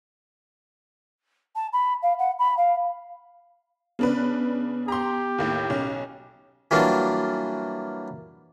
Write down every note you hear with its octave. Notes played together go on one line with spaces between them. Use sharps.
A5
B5
F5
F#5
B5
F5
C#3 B3 D4 B4
G4 A#5 C6
D#2 A2
B1 C#4
E3 F#3 G3 A#3 D4 F4